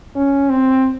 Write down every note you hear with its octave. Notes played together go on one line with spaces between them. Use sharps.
C#4
C4